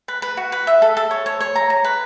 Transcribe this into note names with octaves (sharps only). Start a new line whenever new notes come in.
B4
B4
F#4
B4
E5
A4
A4
C#5
C#5
C#5
A#5
A#5
B4